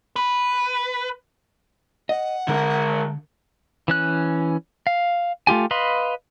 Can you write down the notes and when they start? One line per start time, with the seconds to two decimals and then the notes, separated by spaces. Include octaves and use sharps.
0.16 B4
2.09 D#5 F#5
2.48 D3 G#3 A#4
3.88 E3 C#4 F#6
4.87 F5
5.47 A3 F4 G4 G#5
5.71 B4 D#5 F5 B5 C6